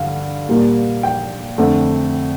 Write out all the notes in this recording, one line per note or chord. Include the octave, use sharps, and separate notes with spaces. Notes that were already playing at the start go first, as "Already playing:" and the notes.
Already playing: G2 D3 F5
A#2 G3 A#3
G5
F2 D3 A3